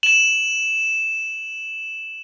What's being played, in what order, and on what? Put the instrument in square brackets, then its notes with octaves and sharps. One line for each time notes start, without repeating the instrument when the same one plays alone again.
[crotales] E7 F#7